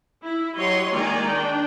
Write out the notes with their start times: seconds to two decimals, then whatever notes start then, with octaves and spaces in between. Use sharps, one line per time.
0.24 E4
0.57 F#3 G4 C#5 D#5 C6
0.94 D#3 G#3 A#3 D5 G#5 A#5
1.29 D4 G5